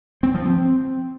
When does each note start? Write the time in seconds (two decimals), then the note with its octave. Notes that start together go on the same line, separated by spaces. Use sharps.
0.23 C4
0.34 F3
0.46 C4